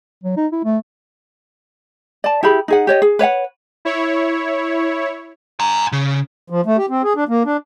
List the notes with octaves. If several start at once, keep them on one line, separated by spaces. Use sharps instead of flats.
F#3
D#4
E4
A3
D5 A5
E4 G4 G#4 B5
D#4 G#4 F#5
G4 C#5 D#5
G#4
B4 C#5 F5 F#5
E4 C#5
G#5 A#5
C#3
F3
A3
G4
C4
G#4
D4
A#3
D4